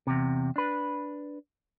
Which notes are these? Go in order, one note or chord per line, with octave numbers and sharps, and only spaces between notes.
E2 C3
D4 B4